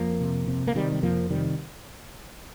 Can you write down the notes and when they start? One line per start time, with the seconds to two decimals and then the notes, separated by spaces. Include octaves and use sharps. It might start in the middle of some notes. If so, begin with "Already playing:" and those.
Already playing: F2 F3 A#3
0.20 C3
0.48 C3
0.67 A#3
0.75 C3 D#3 G3
0.92 G3
1.03 F2 F3 A#3
1.30 C3 D#3 G3